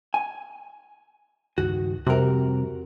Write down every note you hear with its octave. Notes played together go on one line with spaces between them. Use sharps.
G#5
C#2 G2 D#3 F#4
F2 C3 G3 F#4 A#4